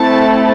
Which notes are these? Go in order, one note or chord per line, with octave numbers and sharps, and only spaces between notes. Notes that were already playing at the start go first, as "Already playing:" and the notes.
Already playing: A3 C4 E4 A4 A5